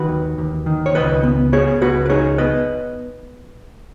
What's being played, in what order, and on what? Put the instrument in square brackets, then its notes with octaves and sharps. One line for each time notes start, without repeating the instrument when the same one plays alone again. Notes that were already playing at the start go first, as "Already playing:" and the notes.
Already playing: [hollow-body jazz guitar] D#3 F#4 B4
D#2
D#2
D#3
C#5
C#2 B4 D#5
B3
B3 G#4 C#5
C#2 F#4 B4
B4
D#4 G#4 C#5
B3 B4 D#5